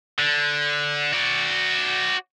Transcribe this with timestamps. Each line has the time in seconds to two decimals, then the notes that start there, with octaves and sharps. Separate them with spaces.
0.19 D3
1.13 F#4 D5